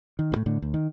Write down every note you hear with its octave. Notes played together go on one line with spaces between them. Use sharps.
D#3
D2 A2
A2 D3
D2
D#3